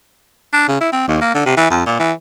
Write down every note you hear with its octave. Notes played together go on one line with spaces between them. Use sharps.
D4
C#3
E4
C4
D#2
A#3
D3
C3
E3
F2
A#2
E3